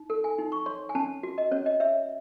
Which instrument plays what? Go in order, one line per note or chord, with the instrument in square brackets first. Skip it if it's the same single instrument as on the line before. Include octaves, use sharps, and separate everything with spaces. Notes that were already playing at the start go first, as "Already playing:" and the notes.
Already playing: [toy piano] D#4
A4
G#5
D#4
C#6
C#5 C6
G#5
C#4 A5
F#4
D#5
C#4 C#5
D#5
C#5 E5